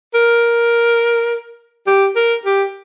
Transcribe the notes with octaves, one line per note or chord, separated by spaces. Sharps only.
A#4
G4
A#4
G4